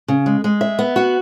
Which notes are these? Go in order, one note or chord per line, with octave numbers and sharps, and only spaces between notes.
C#3
G#3
G#3
E5
B3
F#4